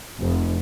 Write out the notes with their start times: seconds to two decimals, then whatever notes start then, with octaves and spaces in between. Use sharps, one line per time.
0.20 F1